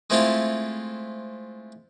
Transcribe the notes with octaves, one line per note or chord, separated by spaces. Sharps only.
G#3 A3 C4 E4 F4 A4